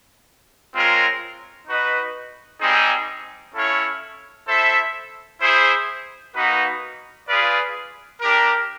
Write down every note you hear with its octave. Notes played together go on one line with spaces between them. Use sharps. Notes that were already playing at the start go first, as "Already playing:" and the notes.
G#3 C4 F4 A#4 C#5
D#4 F#4 B4 D#5
G3 C4 D#4 G#4
C#4 E4 A4 C#5 F5
E4 A4 C5 E5
E4 G#4 C5
A#3 D#4 F#4 B4
F4 G#4 B4 D5 F5
D4 G4 A#4